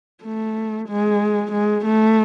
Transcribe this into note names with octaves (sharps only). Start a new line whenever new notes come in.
A3
G#3
G#3
A3